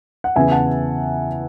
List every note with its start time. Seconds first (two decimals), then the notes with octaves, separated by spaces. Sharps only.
0.24 F#5
0.36 E2 C#3 E3 B3 E5 G#5
0.51 F#5 A5